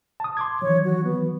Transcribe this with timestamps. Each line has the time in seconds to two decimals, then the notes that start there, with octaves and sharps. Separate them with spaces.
0.20 A5 D#6
0.37 C6 D6 G#6
0.62 D#3 E3 F#3 C#5
0.85 F#4
1.04 B3